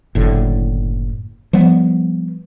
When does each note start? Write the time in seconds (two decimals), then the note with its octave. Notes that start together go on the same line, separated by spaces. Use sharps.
0.15 F#1 A2 D3
1.53 F3 G3 B3